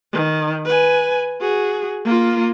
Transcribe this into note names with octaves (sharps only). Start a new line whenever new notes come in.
D#3
B4 G#5
F#4 G#4
A#3 F4